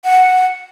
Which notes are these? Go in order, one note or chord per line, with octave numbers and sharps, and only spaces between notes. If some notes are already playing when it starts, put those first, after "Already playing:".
F#5